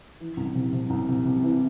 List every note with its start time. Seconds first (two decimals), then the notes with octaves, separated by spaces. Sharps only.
0.20 E3
0.37 C2
0.55 C3
0.72 C3
0.90 C2
1.08 C3
1.25 C3
1.44 E3